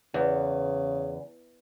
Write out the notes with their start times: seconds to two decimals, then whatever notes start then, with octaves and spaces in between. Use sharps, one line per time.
0.14 E2 C#3